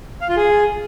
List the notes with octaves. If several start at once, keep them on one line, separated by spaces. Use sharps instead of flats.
F5
F4
G#4